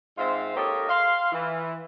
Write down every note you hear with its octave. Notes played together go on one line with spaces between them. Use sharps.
G#2 C4 F4 C5 E5 F5
A#3 D#4 G4 A4 C#5 D#5
F5 C6
E3